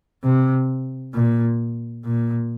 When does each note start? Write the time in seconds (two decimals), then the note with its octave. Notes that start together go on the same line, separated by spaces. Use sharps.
0.24 C3
1.14 A#2
2.05 A#2